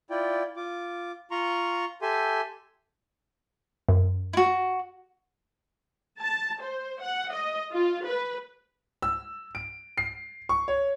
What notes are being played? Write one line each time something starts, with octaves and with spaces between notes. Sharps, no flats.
E4 F4 D5 G5
F4 D6
F4 A#5 C6 C#6
G4 A4 E5 G#5 C6
F#2
E4 F#4
A5
C5
F#5
D#5
F4
B4
E6
D7
C7
C#6
C#5